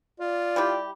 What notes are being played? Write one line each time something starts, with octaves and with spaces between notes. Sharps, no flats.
F4 D5
G3 E4 G4